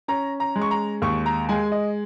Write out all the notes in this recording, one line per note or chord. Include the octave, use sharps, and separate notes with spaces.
C#4 A#5
A#5
G#3
C#6
A#5
D#2 C#6
A#5
G#3 G#5
D#5